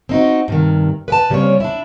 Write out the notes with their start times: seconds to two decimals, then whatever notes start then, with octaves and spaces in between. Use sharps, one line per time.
0.09 C4 D#4 F#4
0.48 G2 C3 D#3
1.08 B4 G5 A5
1.30 C#3 G3 A#3 C4 C#5
1.60 D4 E4